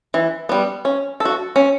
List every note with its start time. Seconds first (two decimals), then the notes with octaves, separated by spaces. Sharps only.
0.14 E3
0.49 G3 B3
0.85 C#4
1.20 A4
1.25 F#4
1.56 C#4